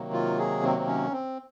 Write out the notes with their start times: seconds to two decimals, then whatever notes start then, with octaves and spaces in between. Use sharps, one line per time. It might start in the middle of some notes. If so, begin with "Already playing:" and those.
Already playing: C3 D#3 F#3 A#3
0.13 F4
0.38 G#4
0.63 C4
0.79 C4
0.87 C#4
1.12 C4